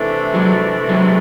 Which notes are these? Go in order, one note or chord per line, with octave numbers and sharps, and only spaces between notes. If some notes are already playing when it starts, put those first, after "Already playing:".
Already playing: C3 E3 A3 D4
F#3 G#3
F#3 G#3